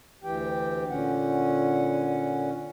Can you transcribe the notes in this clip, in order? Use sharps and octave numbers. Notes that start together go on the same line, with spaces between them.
D2 E3 G4 G5
A#2 D3 C#4 F#5